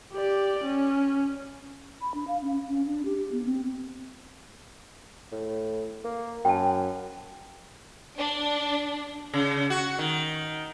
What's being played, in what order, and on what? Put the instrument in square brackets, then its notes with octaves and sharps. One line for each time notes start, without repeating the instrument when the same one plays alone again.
[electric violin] G4 D5
C#4
[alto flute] B5
D4
F5
C#4
C#4
D4
G4
G4
B3
C4
[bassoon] A2
A#3
[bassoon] F#2 [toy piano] G5 A5
[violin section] D4
[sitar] C#3
F#4
D#3